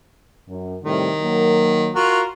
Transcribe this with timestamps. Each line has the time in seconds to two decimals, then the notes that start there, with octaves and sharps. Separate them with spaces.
0.49 F#2
0.84 A2 C3 D#3 G3
1.21 F#3 A#3
1.95 F4 F#4 A#4